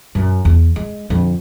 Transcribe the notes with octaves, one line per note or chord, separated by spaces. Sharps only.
F#2
E2
G#3
F2 D3